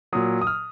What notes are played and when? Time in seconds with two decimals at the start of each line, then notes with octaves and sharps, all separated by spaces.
0.13 A#2 F#3 D#6
0.42 D#6
0.47 F6